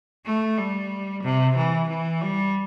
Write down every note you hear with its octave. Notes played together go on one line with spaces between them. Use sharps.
A3
G3
C3
E3
E3
G3